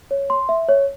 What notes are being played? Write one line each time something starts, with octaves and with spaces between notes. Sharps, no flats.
C#5
C6
E5
C#5